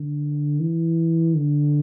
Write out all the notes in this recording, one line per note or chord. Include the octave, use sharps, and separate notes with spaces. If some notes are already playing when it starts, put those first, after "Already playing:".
Already playing: D3
E3
D3